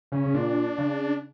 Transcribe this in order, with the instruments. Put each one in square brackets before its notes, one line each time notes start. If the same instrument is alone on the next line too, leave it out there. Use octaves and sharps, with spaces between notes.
[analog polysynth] C#3 [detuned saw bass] C#4
[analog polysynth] C#3
[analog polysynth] A#2 [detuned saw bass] D4
[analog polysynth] C#3